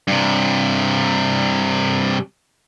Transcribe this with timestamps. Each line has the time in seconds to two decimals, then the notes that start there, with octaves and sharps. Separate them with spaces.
0.08 G2 C3